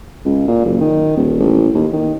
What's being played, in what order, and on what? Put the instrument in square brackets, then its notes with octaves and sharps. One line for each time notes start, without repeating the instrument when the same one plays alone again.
[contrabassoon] C#2
A#2
F#1
D#3
D#1
A1
D#2
D#3